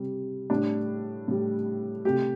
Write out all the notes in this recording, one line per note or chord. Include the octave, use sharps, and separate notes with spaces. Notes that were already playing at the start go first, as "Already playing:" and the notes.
Already playing: C3 G3
A2 G3 D4
A2 G3
C3 A3 G4